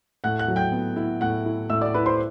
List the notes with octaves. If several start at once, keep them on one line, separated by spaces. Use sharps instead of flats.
A2 F#5 F#6
F#5 F#6
F#3
G5 G6
B3
E4
A2 F#5 F#6
E4
A2 E5 E6
D5 D6
E4 B4 B5
C5 C6